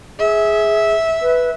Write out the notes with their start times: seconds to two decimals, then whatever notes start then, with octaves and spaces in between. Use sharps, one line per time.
0.19 G#4 E5
1.22 B4